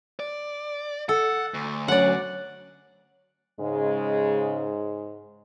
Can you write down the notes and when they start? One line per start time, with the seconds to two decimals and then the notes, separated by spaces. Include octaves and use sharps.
0.20 D5
1.09 A4 F#5
1.54 D2
1.88 F#2 F#3 C#4 D5 F#5
3.60 G#2 C#3 G#3